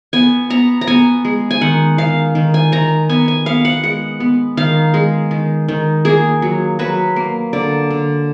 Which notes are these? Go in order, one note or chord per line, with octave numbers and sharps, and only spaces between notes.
B3 G#5
B3 A#5
A#5
B3 G#5
G#3
G#5
D#3 F#5
D#3 F5
D#3
G#5
D#3 A#5
B3 G#5
G#5
B3 F5
F#5
G#3 F#5
B3
D#3 F5
G#3
D#3
D#3
A#3 G#4
F#3
F#3 B4
A#3
D3 D5
D3